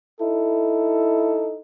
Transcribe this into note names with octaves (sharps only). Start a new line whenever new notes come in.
D#4 E4 A4